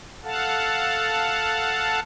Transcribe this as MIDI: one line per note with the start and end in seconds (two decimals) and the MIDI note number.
0.24 2.00 69
0.24 2.00 77
0.24 2.00 78
0.24 2.00 81